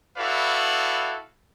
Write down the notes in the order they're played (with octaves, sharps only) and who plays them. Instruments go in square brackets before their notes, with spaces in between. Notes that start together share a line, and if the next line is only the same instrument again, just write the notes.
[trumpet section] E4 F#4 A4 B4 D5 F5